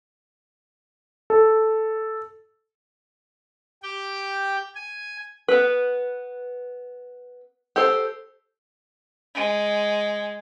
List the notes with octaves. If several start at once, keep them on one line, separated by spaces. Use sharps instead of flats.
A4
G4 G5
G#5
B3 B4
G4 A4 C5
G#3